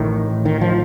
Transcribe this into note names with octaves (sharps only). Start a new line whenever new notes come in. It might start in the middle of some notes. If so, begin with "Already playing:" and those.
Already playing: A1 A2 D#3
D#3
F3